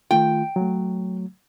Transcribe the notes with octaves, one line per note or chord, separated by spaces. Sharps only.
D#3 A3 F4 G5
F#3 A3